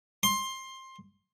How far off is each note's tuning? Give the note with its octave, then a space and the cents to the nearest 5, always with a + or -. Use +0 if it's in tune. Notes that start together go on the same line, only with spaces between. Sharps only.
C6 +15